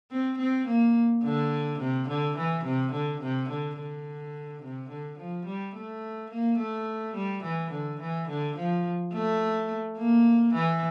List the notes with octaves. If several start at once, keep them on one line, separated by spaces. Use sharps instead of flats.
C4
C4
A#3
D3
C3
D3
E3
C3
D3
C3
D3
D3
C3
D3
F3
G3
A3
A#3
A3
G3
E3
D3
E3
D3
F3
A3
A#3
E3